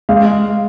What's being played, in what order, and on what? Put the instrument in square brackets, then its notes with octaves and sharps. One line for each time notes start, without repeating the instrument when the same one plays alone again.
[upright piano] G#3 [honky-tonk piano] F5